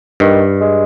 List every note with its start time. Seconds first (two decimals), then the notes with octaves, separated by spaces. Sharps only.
0.20 G2 D#3
0.61 G#3